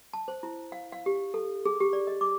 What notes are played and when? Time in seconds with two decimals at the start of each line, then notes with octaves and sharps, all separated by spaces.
0.13 A5
0.28 C5
0.43 E4
0.72 F5
0.92 F5
1.06 G4
1.34 A4
1.66 G#4
1.80 G4
1.93 D5
2.07 D#5
2.21 D6